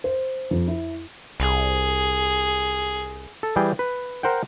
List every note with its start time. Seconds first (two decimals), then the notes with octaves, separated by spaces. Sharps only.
0.04 C5
0.51 F2
0.67 E4
1.40 C2 G#4
3.43 A4
3.56 E3 G3 G#4 G5
3.79 B4
4.23 A#4 C5 F#5 G5